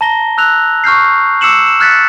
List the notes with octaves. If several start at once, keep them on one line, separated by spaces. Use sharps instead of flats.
A5 A#5 A#6 G7
E6 F#6 F7
C#6 F6 G6 C7
D6 E6 C7 C#7 E7 F#7
E7
F6 F#6 G#6 A6 B6 C#7